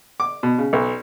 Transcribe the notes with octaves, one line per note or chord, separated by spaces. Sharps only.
D6
B2
C#3
B1